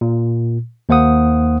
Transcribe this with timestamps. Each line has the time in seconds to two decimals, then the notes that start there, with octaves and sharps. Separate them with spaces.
0.01 A#2
0.89 D#2 A#3 C5 F#5 D#6